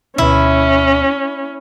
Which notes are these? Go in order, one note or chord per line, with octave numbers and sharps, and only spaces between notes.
D2 B2 C#4 E4